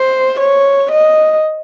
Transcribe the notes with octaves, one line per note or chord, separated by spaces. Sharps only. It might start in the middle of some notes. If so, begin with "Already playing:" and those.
Already playing: C5
C#5
D#5